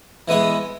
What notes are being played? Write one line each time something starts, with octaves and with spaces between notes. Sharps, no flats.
E3 G#3 B3 G#4